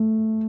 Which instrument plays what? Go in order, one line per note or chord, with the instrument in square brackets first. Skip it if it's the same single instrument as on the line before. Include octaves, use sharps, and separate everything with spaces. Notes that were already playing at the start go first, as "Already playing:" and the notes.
Already playing: [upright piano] A3